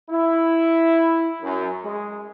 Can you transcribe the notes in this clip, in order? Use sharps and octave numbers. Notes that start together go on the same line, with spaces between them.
E4
F#2
G#3